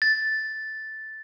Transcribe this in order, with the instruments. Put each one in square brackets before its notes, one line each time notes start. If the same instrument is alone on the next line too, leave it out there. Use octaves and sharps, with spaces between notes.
[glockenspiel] A6